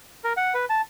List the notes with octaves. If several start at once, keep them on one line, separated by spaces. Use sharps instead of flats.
A#4
F#5
B4
A5